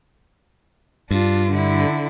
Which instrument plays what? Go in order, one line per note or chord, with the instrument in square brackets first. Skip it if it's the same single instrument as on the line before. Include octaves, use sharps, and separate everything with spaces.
[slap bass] G2 [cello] D4 F4
[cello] D3 E4